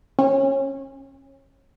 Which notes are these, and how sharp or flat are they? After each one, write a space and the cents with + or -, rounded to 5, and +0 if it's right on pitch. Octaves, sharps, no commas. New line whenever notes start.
C#4 -25